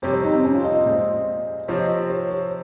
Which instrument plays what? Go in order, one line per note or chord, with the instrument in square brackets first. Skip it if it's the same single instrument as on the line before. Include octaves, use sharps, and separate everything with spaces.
[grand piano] F2 C3 G3 [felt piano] C#5
[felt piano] C#5
D#4
C4
C#4
F4
D#5
D#5
[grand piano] A#2 G#3 C4
[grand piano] C3 F3 C4 [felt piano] C#5
[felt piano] D#5
C#5
C#5